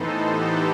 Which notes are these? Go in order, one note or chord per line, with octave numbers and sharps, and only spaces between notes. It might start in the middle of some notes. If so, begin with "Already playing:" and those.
Already playing: A2 E3 B3 D#4 A4 C5
G4 B4